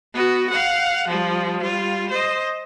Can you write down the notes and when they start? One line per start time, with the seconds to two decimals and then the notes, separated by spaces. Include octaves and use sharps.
0.14 B3 F#4
0.49 F5 F#5
1.08 F3 G3
1.62 G3 F4
2.09 C5 D#5